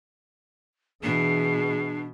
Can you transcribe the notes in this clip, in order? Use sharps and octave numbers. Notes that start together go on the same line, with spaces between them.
B2 E3 D4 G#4